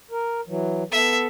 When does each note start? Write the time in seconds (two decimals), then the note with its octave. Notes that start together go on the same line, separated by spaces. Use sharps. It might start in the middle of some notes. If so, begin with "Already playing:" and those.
0.11 A#4
0.47 E3 F#3
0.92 B3 A4 E5